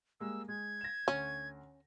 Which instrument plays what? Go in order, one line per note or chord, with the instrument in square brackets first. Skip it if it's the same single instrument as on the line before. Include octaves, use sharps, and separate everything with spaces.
[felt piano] G3 G#3 A#3 [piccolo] E6
[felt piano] G#3 [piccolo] G#6
[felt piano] A#6 E7
[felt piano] D2 [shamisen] C#4